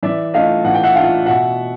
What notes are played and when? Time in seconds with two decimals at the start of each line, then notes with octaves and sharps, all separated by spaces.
0.03 E3 D5 E5
0.34 A3 D4 F4 D#5 F5
0.65 E3 F#5
0.74 G5
0.83 E5 F#5
0.95 A3 D4 F4 F5 G5
1.26 B2 E5 F#5